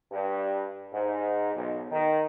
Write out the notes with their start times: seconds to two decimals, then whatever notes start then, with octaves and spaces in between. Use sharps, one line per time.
0.11 G2
0.92 G#2
1.55 B1
1.91 D#3